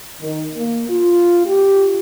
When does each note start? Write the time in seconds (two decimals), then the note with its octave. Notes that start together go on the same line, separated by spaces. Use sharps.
0.21 D#3
0.54 A#3
0.89 F4
1.46 G4